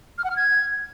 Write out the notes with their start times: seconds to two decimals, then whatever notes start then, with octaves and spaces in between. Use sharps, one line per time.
0.18 F6
0.24 F#5
0.30 F6
0.36 G#6